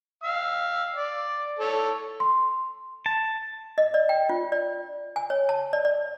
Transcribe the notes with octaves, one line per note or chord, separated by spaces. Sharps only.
F5 E6
D5
A4 C#5
C6
A5
D#5
D5
G5
F4
D5
G#5
C#5
A5
D5
D5